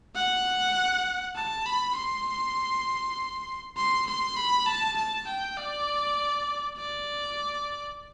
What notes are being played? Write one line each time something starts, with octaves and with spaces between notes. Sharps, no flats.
F#5
A5
B5
C6
C6
C6
B5
A5
A5
G5
D5
D5